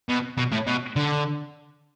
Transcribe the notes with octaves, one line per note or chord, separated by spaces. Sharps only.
B2
B2
A2
B2
D3